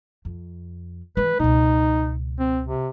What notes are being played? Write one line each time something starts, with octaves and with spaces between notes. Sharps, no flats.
F2
E3 G#3 B4
C#2 B2 D#4
C4
C3